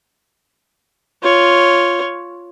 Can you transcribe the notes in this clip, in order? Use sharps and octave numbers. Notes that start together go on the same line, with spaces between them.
F4 C#5